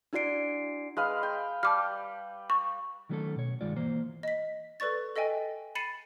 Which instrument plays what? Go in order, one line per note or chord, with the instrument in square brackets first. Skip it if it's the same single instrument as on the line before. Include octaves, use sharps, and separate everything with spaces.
[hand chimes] D4 E4 F#4 D5 C7 D7
[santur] G#3 B4 F5
G5
[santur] G3 [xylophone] A5 D6 F6
[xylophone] C#6
[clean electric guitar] D#3 F#3 A3 C#4 G4 A4
B2 C#5
C#2 G2 D#3 G#3 F4 D5
E3 A#3 C5
[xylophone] D#5 B6
A4 B4 D5 C#6 A6
A4 D#5 E5 G5 G#5
B5 A6 C7 C#7 D#7 E7